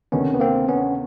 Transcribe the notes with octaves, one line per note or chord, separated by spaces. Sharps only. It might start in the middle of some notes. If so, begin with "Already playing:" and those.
D2 C3 D#3 B3 C#4
B3
A#3 C4
B3 C#4